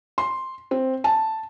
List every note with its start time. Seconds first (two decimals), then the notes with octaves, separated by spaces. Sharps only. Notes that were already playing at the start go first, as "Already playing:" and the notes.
0.18 C6
0.71 C4
1.04 A5